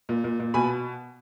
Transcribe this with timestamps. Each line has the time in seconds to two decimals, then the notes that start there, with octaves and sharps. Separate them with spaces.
0.09 A#2
0.24 A#2
0.40 A#2
0.54 B2 G#5 B5